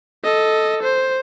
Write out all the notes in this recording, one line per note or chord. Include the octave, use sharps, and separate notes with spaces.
A4 D#5
C5